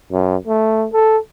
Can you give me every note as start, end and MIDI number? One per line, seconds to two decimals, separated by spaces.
0.11 0.36 42
0.47 0.87 57
0.93 1.18 69